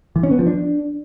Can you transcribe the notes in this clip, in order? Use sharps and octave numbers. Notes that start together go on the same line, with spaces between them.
E3
C#4
B3
F3
D4